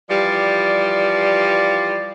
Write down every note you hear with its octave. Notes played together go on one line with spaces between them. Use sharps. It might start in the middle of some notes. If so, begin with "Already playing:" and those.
E3 F3 G3 D5